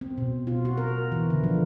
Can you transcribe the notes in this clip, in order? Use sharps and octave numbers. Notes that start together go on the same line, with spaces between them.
C4
B2
F4
F#4
A#4
E3
D3
F3